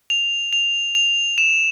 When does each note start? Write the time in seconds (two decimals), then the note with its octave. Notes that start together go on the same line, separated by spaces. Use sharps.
0.10 F7
0.53 F7
0.95 F7
1.38 E7